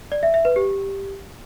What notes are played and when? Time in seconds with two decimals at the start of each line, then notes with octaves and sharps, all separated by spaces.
0.12 D5
0.23 E5
0.34 E5
0.45 B4
0.56 G4